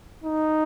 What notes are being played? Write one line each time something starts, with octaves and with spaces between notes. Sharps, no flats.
D#4